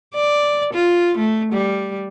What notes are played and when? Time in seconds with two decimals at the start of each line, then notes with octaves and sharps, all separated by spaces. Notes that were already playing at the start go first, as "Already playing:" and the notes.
0.15 D5
0.74 F4
1.18 A3
1.53 G3